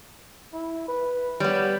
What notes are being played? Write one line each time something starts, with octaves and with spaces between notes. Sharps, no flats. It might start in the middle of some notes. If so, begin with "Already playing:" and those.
E4
B4
G3 B3 C#5